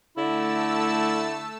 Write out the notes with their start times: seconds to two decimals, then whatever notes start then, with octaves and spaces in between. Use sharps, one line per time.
0.17 D3 A3 E4 A5 E6